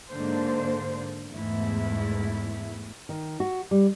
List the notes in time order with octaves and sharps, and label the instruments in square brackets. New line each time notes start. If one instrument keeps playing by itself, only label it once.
[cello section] G#2 D3 A#3 D4 C5
E2 G#2 A3 E4
[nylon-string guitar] D#3
F#4
G3